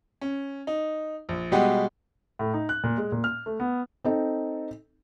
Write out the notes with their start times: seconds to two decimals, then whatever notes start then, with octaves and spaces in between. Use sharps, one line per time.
0.21 C#4
0.67 D#4
1.29 A#1
1.52 B2 G3 G#3 G4 F#5
2.39 A2
2.54 D#4
2.69 F#6
2.84 A#2
2.97 G#3
3.12 A#2
3.24 F6
3.46 A3
3.60 B3
4.04 C4 D#4 A4